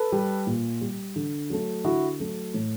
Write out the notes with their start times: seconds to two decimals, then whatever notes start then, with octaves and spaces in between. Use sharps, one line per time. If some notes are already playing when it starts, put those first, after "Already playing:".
Already playing: A4 B4
0.12 G3
0.47 A#2
0.81 G3
1.16 D3
1.50 F#3 A3
1.84 D3 E4 F#4
2.20 F#3 A3
2.54 A2